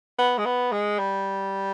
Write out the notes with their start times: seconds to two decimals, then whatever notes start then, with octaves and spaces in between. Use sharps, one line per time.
0.19 B3
0.38 G#3
0.46 B3
0.72 G#3
0.99 G3